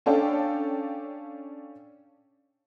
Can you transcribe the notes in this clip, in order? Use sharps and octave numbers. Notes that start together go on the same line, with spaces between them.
C#4 D4 A4 D5 F5 G5